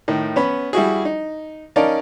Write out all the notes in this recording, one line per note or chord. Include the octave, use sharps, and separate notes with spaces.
A2 D#3
B3 C#4 B5
G3 E4 F#4 G#4
D#4
C#4 D#4 A#4 D5 F5 A5